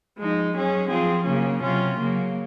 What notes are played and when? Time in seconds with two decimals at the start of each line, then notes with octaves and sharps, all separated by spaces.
0.18 F3 G#3 D#4
0.54 F#3 C#4 G#4
0.90 F3 C4 F4 G#4
1.26 C#3 F#3 A#3 C#4
1.62 C3 F#3 C#4 F4
1.99 C#3 F#3 A#3